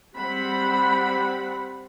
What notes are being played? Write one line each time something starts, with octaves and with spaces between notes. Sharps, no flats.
G3 C4 F#5 B5